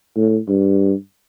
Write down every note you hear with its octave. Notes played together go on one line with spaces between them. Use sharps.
A2
G2